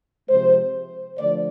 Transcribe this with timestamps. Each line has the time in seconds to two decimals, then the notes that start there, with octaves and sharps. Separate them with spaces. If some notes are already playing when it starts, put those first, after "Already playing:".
0.29 C3 F3 G#3 C5
1.18 D3 F3 A3 D5